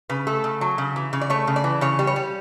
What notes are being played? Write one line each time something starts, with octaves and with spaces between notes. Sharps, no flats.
C#3 B4
A3 A4
C#3
F#3
C#3
E3
C#3
D5
A3 C#5
C#3
D5
E3
C#3 C#5
G3
C#5
G3